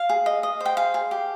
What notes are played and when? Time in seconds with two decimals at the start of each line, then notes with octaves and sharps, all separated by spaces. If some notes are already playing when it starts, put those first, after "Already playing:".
Already playing: F5
0.09 G#4
0.26 D#5
0.43 D#5
0.61 C5 G5
0.77 G#4 F5
0.94 G#4
1.11 G4